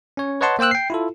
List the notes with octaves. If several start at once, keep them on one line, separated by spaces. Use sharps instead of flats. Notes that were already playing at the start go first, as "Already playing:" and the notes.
C#4 C#5
B4 C#5 D#5 F#5 A5 C6
A#3 C5 G5 E6 F#6
G5 C7
E4 F4 A4